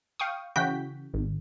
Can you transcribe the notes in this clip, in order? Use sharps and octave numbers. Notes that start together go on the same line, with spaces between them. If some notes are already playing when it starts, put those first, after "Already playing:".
F5 G5 C#6 D#6
C#3 E3 F#4 G5 G6 B6
G#1